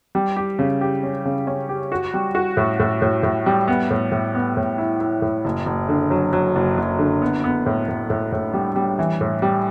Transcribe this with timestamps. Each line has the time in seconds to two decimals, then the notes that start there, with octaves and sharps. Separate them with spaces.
0.15 G3
0.36 G4
0.59 C#3
0.81 G4
1.03 C#4
1.25 C#3
1.47 C#4
1.69 G4
1.92 F#4
2.14 G3
2.35 F#4
2.57 A2
2.80 A2
3.02 A2
3.23 A2
3.46 G3
3.68 B3
3.91 A2
4.12 A2
4.35 B3
4.57 A2
4.78 E4
5.00 E4
5.22 A2
5.45 F#1
5.66 F#1
5.89 D3
6.11 F#3
6.33 F#3
6.56 F#1
6.78 F#1
6.99 D3
7.22 B3
7.44 B3
7.66 A2
7.88 A2
8.10 A2
8.32 A2
8.54 G3
8.76 G3
8.99 E3
9.21 A2
9.42 G3